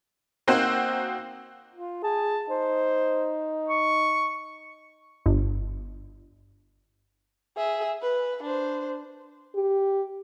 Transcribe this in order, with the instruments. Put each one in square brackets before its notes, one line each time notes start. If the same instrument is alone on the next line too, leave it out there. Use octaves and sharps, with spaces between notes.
[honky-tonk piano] A#3 C4 D#4 F#4 C5
[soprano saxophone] F4
[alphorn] G#4 [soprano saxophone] A5
[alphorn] D#4 [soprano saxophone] C5
[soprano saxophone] C#6
[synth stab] G1
[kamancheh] G#4 E5
B4
D4 C5
[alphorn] G4